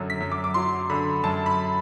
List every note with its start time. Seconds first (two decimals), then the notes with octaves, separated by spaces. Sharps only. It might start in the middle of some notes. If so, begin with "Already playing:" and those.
Already playing: F#2 D3 F#3
0.10 B6
0.20 F#2
0.32 D6
0.44 D6
0.54 F#3 C6
0.90 D3 B5
1.23 F#2 A5
1.46 B5